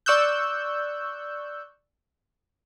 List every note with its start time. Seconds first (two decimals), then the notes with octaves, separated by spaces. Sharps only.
0.06 D5 C#6 E6 F#6 G6